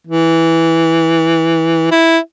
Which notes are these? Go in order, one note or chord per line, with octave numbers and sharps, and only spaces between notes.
E3
E4